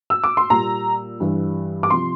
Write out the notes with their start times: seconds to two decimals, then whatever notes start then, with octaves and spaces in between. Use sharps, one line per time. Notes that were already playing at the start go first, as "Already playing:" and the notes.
0.10 E6
0.24 D6
0.37 C6
0.50 A#2 G3 A#5
1.20 G2 E3 G3
1.83 D6
1.90 C3 F3 C6